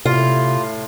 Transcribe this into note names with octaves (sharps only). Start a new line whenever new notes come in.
A2 C3 F4